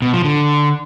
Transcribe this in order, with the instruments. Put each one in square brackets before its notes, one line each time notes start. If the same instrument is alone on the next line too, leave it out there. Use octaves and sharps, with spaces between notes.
[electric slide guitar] B2
F3
D3